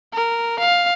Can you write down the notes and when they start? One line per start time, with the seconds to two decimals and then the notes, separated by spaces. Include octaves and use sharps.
0.13 A#4
0.59 F5